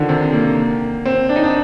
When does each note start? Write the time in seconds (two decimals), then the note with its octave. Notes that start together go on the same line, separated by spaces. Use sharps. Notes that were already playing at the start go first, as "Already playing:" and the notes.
Already playing: D3 D#3 F3
0.09 C3
0.33 A#3
1.06 C4
1.29 D4
1.36 D#4
1.43 D4